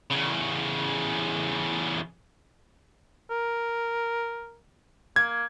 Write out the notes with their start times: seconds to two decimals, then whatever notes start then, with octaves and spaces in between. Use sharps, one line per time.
0.11 E2 C#3
3.30 A#4
5.16 A#3 G#6